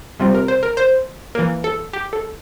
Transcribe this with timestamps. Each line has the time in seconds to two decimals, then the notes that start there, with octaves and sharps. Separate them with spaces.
0.19 C3 G3 C4 F4
0.35 A#4
0.48 C5
0.63 A#4
0.77 C5
1.35 E3 A#3 A#4
1.64 A4
1.93 G4
2.13 A4